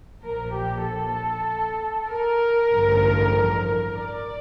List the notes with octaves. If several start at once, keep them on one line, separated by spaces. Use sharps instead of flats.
A#1 A#2 F3 A#4
G4
A4
A#4
A1 G2 D3 F3
D5